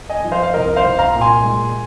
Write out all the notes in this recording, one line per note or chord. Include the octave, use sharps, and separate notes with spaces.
D#5 G#5
F3
C5 F5
F5
C2 A#4 D#5
C5 F5
C2
F5 A#5
A#2
G#5 C6
G#3